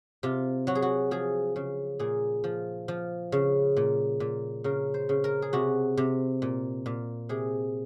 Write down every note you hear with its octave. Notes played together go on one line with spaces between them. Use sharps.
C3 F4
F#3 F#4
G#4
F#4
F3 G#4
C#3
A#2 G#4
F3
F3
C#3
A#2
A#2
C#3 A#4
C5
C#3
A#4
G#4
C3 F#4
C3
A#2
A#2
C3 G#4